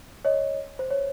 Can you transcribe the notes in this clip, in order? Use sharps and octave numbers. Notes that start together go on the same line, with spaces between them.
C#5 D#5
C5
C#5